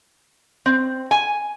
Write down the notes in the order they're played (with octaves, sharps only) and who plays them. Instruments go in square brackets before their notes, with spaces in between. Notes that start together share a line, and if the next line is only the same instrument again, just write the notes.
[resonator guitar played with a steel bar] C4
G#5